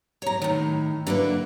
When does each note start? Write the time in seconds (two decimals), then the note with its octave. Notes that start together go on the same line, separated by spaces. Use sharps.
0.22 C#5 A#5
0.42 A2 D#3
1.07 D3 A#3 E4 B4